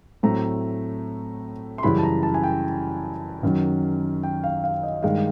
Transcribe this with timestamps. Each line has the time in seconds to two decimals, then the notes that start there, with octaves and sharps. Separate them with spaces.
0.23 A2 F#3 A3 C4 A#5
1.78 C6
1.83 F#2 C#3 E3 G3 B5
1.98 A5
2.03 A#5
2.23 A5
2.34 G#5
2.43 G5
3.43 F#2 D#3 F#3
4.23 G5
4.44 F5
4.64 F5
4.83 D#5
5.03 G2 D#3 G#3 F5